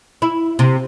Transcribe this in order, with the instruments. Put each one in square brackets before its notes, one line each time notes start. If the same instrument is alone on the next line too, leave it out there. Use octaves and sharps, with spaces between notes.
[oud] E4
C3